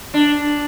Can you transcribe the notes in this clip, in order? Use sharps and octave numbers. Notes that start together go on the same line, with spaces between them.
D4